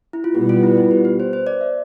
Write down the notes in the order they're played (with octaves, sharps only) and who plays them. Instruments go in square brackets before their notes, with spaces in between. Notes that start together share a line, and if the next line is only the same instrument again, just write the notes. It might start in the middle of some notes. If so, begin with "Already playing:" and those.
[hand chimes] E4
F4
[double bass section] B2 G3 B3 [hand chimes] G4
[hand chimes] F4
E4
F4
G4
B4
C5
C5
D5
E5